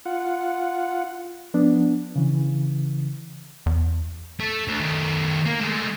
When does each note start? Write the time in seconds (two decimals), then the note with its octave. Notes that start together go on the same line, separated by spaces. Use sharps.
0.06 F4 F#5
1.54 F3 B3 D4
2.16 C#3 E3
3.66 E2
4.40 A3
4.68 D2
4.80 D#3 A3
5.46 A#3
5.61 G#3 A3